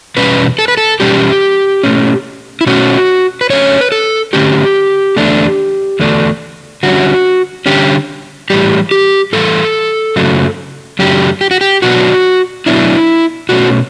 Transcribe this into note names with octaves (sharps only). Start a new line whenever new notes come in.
E2 B2 G3 C#4 B4
A4
B4
A4
E2 B2 G3 C#4 G4
B2 A3 C#4
E4
B2 A3 C#4 F#4
B4
D3 F#3 A3 C#4 C#5
B4
A4
D3 F#3 A3 C#4 G4
E2 D3 A3 D4
E2 D3 A3 D4
D3 G3 C#4 F#4
D3 G3 C#4 G4
A2 E3 G3 G4
G4
A2 E3 G3 A4
F#2 C#3 F#3 A3
F#2 C#3 F#3 A3 G4
G4
F#4
G4
B2 F#3 B3 D4 F#4
B2 F#3 B3 D4 E4
B2 A3 C#4 F#4